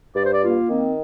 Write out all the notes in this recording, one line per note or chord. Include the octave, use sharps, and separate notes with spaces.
G2 D5
C5
D5
A#3 F4
D#3 C4